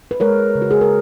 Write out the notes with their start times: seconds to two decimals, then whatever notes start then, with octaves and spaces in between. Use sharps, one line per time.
0.11 B4
0.20 G#3 A#4 C#5
0.55 C#3
0.62 F#4
0.71 G#4
0.81 A#4